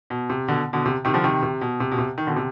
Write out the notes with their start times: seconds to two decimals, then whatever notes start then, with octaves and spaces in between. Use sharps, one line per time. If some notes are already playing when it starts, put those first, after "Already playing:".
0.10 B2
0.30 C3
0.48 B2 D3
0.73 B2 D3
0.86 C3
1.05 C3 D#3
1.14 D3 F3
1.24 C3 D#3
1.42 C3
1.61 B2
1.80 C3
1.92 B2
1.98 C3
2.18 D#3
2.27 B2 D3
2.36 C3